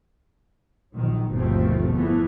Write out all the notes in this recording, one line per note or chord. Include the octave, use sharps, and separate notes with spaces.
A#1 D#3 F#3
G1 D#2 B2 F3 A3 C4
E2 E3 F3 A3 B3